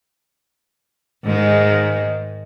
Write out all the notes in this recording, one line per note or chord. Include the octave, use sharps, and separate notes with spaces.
G#2 D#3 G#3